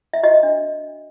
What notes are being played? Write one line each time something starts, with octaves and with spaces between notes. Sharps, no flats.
E5
F#4 D#5
D4